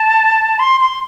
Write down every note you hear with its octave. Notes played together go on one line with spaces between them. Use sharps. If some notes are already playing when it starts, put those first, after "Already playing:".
Already playing: A5
C6
C6